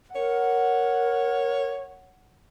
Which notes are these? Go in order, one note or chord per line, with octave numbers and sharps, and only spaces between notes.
A#4 C#5 F#5